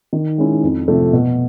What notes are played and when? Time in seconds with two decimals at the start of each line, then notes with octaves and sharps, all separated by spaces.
0.13 D#3
0.38 G#3 C#4 E4
0.63 F2
0.88 C3 F3 A3
1.13 B2